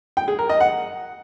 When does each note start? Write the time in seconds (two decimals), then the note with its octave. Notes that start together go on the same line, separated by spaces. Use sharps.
0.17 G5
0.28 G#4
0.39 A#4
0.50 D#5
0.60 F#5